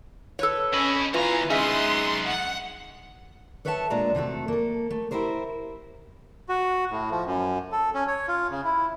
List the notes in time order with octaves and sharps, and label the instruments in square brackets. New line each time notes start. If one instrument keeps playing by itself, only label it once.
[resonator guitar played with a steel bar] A4 B4 C#5
[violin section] C#4 [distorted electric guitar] D#5 B5
[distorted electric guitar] B2 A#5 [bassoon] E3 [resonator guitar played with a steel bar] F4 [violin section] F5 G#5
[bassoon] G#3 [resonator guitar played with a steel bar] C#4 E5 [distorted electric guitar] D#4 B4 [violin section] C6 D#6
[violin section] F#5
[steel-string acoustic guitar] A4 B4 C#5 E5 G5 A5
A#2 G#3 D4 A#5
C3 A3 F#4 A4
A#3 A4
A3
E4 G4 A#4 C5 C#5
[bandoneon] F#4
A2
F3
F#2
A4
C#4
C#5
F4
C#3
E4